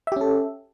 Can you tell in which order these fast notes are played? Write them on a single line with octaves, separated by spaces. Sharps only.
E5 G4 C#4 A4